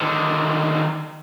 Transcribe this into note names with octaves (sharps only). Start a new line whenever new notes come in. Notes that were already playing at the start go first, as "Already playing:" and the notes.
D3 D#3